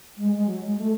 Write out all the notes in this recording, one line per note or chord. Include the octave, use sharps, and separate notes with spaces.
G#3
G#3
F#3
G#3
A3